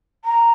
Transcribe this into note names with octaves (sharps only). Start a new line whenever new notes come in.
A#5